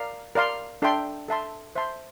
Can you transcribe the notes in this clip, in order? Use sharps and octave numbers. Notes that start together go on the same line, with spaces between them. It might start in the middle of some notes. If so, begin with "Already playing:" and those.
Already playing: A#4 D5 F5 A#5
A#4 D5 F5 C6
D4 A4 E5 G5 C6
A4 E5 A5 C6
C5 E5 A5 C6